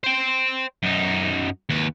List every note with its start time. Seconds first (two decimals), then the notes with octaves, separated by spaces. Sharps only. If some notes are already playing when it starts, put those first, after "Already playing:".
0.03 C5 G5
0.83 F#2 D#4
1.70 D#2 B4